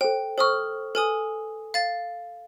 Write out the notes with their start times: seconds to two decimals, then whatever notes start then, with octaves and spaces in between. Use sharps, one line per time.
0.01 A4 C5 G5
0.38 A4 C5 C#6 D#6 F6
0.95 A4 B4 G#5 D#6
1.74 F5 A6